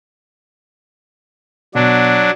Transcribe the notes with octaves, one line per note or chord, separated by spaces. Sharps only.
B2 F#3 D4